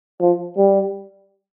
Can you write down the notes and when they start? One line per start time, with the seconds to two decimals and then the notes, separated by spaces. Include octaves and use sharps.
0.21 F3
0.57 G3